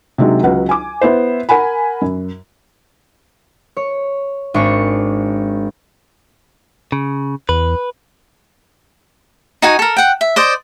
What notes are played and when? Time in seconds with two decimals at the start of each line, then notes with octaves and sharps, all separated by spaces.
0.18 C3 D#3 F#3 G#3 D4
0.43 C#2 F#3 B4 F#5
0.69 G#5 D6
1.01 B3 E4 C5
1.49 A#4 F#5 G#5 B5
2.02 F#2
3.77 C#5
4.54 G#1 D4 C#6
6.92 C#3
7.49 E2 B4
9.62 D#4 F#4 G#5
9.79 A4 A#4
9.97 F#5 G5
10.21 E5
10.36 C5 D5 D#5